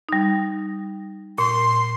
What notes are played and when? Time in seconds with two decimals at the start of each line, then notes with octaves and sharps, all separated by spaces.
0.09 G3 D#4
1.38 A#2 C6